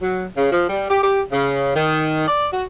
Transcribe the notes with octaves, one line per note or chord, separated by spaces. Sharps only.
F#3
C#3
F3
G3
G4
G4
C#3
D#3
D5
F#4